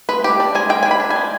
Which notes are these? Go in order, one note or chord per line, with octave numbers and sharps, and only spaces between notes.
G#3 B4
D4 G4
D4 D5
G#3 G#5
G#3 G5
G#5
D4
B5
D4
G#5
G#3